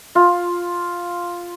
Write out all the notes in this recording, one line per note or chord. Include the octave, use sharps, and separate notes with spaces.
F4